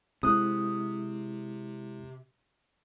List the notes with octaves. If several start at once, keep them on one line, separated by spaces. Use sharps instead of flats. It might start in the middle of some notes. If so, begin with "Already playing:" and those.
C3 G#3 C4 E4 D#6 F#6